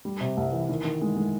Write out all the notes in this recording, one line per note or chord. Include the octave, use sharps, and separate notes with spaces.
G3
C3
C2
E3
D#3
D#3
G#3
G#3